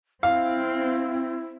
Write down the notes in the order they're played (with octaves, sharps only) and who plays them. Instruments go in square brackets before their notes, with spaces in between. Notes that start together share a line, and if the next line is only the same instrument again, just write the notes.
[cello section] C4 [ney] E4 [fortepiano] F5